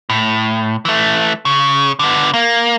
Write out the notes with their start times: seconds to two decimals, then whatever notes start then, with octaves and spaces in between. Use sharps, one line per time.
0.10 A2
0.85 E3 A3
1.45 C#3
1.99 D3 B3
2.34 A#3